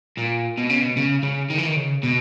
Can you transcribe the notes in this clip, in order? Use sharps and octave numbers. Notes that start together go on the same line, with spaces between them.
A#2
B2
C#3
B2
C#3
C#3
D#3
E3
D#3
C#3
B2